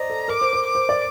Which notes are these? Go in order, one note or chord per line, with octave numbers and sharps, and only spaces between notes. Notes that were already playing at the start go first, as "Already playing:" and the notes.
Already playing: C5 D5 D#5 A#5
A4
A#4 D6
C5
C5
D6
C5
D5